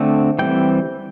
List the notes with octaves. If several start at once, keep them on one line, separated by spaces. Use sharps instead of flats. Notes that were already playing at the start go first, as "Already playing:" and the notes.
Already playing: D3 A3 C4
E3 G3 C4 G5